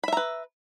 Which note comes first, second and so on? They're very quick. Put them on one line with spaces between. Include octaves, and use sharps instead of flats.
B5 E5 A#5 B4